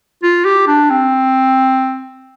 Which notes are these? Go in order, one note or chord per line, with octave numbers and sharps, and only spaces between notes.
F4
G4
D4
C4